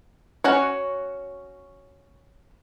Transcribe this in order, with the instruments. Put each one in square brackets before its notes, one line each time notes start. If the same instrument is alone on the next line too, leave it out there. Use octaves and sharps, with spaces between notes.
[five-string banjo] C#4 F#4 C#5